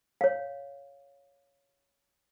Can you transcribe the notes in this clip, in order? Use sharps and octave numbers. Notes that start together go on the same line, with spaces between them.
C#5 F5